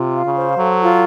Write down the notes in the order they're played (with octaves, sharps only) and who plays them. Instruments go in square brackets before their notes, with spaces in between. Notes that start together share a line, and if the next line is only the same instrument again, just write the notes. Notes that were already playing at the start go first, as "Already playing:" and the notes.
Already playing: [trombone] C3 [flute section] F4
[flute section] F5
[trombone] C#3
[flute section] C5
[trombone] F#3 [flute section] A4
[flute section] F4